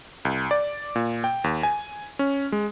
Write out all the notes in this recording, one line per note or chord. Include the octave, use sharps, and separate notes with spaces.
C2
D5
A#2
G5
D#2
G#5
C#4
G#3